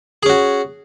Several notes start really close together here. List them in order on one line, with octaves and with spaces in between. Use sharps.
G#4 C#4 F#4